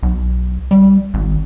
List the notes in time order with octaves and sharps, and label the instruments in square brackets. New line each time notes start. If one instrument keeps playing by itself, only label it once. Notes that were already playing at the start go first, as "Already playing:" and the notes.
[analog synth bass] B1
G3
G#1